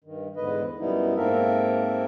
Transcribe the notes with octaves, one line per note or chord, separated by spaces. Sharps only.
G2 D#3
E2 G#2 D3 B4 D#5
F#2 B2 G3 B3 D#4 E4
G#2 A#3 C4 A4 A#4 E5